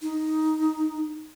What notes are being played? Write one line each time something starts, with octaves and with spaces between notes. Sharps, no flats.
D#4